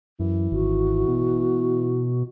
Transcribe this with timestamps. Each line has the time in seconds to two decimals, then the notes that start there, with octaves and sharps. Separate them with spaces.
0.20 F#2 E3
0.52 G#1 F#4
1.08 B2